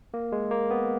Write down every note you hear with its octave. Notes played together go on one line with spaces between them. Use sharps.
A#3
G#3
A#3
B3